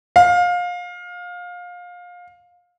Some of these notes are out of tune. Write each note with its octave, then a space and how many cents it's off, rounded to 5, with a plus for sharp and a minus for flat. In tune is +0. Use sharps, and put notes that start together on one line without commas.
F5 +25